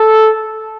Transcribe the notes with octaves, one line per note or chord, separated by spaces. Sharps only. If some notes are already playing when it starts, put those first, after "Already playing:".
Already playing: A4